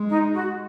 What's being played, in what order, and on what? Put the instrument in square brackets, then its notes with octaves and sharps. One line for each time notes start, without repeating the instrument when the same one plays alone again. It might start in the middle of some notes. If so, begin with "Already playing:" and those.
Already playing: [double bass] G#3
[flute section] D#4
F#4